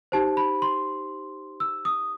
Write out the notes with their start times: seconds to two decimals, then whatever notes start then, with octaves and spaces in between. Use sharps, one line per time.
0.12 D#4 G4 C5 A5
0.37 B5
0.62 C6
1.60 E6
1.85 D#6